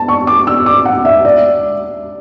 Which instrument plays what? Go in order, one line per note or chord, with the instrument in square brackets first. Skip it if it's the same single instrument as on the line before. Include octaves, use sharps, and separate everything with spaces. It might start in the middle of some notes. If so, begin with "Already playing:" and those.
Already playing: [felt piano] A5
C#6
D6
E6
D6
F#5
E5
D5